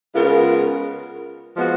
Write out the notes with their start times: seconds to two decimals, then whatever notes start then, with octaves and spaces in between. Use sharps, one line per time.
0.14 C#3 G#3 B3 F4 A#4
1.57 F3 G#3 B3 F#4